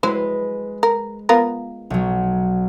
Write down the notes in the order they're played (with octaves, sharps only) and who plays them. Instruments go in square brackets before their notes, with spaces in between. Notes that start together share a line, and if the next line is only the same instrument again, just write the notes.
[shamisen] F#3 E4 C5 [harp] G#3 B4
[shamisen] A#4
B3 F4 A#4
[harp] B1 F#3